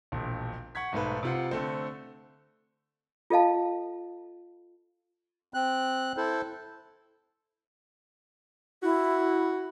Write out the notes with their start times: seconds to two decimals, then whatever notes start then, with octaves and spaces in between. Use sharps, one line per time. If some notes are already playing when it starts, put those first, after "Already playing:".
0.12 E1 A#1
0.75 F#5 C#6 G#6 B6
0.92 B1 G#2 A3 B4
1.23 C3 F4 F#5
1.51 D3 A3 C4
3.30 F4 A4 D#5 F5 A5
5.54 C4 F#6
6.17 E4 A4 C5
8.83 E4 F#4